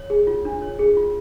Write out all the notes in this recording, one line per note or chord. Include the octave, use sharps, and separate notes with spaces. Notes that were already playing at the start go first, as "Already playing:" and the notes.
Already playing: C#5
G#4
F4
D4
C#5
G#4
F4